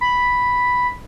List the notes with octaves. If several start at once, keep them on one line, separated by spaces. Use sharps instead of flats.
B5